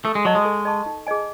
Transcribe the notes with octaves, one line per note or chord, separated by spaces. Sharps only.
A3 A4
G#3
F#3 D#5 A5 C#6
G#3
A4
D#5 A5 C#6
D#4
G#4 D#5 G#5